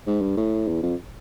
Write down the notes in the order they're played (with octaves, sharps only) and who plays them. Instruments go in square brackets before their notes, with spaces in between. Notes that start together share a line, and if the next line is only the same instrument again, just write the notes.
[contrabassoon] G#2
G2
A2
E2
F2